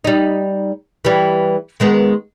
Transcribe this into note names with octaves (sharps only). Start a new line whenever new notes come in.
G3 D#4
E3 G3
D#3 G#3 B3